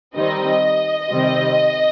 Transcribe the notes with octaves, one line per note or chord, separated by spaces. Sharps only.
D#3 G3 C4 D#4 D#5
C3 D#3 G3 C4